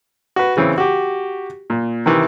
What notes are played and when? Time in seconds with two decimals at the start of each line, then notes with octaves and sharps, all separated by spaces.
0.36 F#4 B4
0.57 C#3 E3 C4
0.78 F#4 G4
1.70 A#2
2.06 C3 D#3 E3